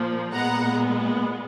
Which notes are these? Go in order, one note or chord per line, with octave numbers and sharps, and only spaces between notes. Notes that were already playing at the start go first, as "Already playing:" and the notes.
Already playing: A#2 F3 A#3
A#2 G#3 B3 F#5 A#5